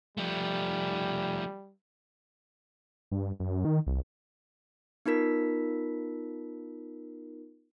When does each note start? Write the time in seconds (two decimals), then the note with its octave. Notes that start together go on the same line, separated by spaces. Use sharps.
0.18 F3 G3 A3
3.12 G2
3.40 F#2
3.65 D#3
3.87 C2
5.06 B3 D#4 F4 A#4 B6